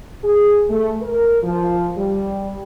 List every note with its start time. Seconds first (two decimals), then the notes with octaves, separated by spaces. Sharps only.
0.23 G#4
0.69 A3
1.02 A#4
1.43 F3
1.98 G3